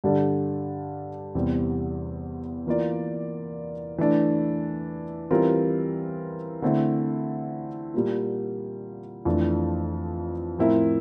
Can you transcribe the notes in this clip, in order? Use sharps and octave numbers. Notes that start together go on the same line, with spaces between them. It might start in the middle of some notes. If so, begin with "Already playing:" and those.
G2 D3 G3 D4 A4
E2 C3 E3 G3 C4
E3 A#3 F4 A#4 D5
E3 A3 D4
E3 G3 C4 F4 A#4
D3 A3 C4 E4
A#2 G3 A#3 F4
F2 E3 A3 D4
A2 F3 C4 E4 A#4